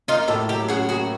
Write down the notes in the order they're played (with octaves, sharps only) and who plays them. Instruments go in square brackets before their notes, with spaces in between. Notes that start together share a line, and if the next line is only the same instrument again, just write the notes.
[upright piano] A#3 [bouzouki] D#4 F4
[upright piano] A2 [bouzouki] G4 A4
[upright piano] F#3 [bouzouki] G4 A4
[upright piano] C#4 [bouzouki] F#4 G#4
[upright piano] A#3 [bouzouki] F#4 G#4